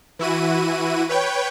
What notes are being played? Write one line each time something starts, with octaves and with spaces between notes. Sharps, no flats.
E3 E4 F#4 D#7
B4 C#5 G5